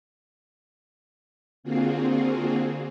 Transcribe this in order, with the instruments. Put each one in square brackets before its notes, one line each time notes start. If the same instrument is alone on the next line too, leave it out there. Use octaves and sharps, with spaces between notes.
[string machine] D3 A#3 C4 F4 F#4 G#4